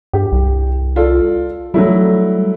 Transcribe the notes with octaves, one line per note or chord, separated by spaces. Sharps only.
G2 G4
C2
F4 A4 D5
F#3 G3 A3 E4